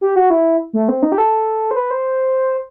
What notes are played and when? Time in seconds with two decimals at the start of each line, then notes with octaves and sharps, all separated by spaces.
0.01 G4
0.16 F#4
0.30 E4
0.73 A3
0.89 C4
1.03 D#4
1.12 G4
1.18 A4
1.71 C5
1.76 B4
1.91 C5